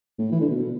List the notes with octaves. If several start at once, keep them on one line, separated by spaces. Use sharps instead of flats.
A2
E3
D3
B2